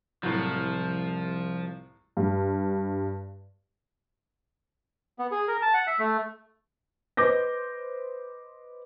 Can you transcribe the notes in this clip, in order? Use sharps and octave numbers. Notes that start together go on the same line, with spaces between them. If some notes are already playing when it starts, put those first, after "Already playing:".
C2 A2 F3 F#3
G2
B3
G#4
A#4
A5
F#5
E5
A3
B4 C5 D#5 D6 G6 A#6